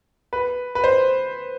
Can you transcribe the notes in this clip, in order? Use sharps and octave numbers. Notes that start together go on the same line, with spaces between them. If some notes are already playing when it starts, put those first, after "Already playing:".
B4
B4
C5